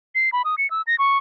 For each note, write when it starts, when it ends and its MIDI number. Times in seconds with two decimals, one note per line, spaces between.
0.15 0.30 96
0.33 0.42 83
0.45 0.55 87
0.58 0.69 97
0.71 0.82 88
0.87 0.96 94
0.99 1.18 85